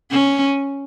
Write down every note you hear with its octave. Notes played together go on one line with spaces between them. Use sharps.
C#4